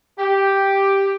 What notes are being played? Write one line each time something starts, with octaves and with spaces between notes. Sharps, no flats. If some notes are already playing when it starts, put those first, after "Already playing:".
G4